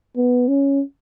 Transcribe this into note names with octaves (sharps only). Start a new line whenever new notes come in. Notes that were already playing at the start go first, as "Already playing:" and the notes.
B3
C#4